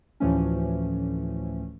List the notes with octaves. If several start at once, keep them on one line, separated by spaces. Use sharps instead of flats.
D2 A2 E3 F3 A3 C#4